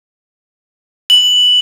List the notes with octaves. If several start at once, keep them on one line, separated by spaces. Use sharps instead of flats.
F#7